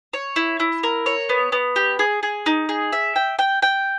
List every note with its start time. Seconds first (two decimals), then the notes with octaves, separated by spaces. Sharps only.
0.13 C#5
0.36 E4
0.60 E4
0.83 A#4
1.06 C#5
1.29 B3
1.52 B3
1.76 G4
1.99 G#4
2.23 G#4
2.46 D#4
2.69 G#4
2.93 E5
3.16 G5
3.39 G5
3.62 G5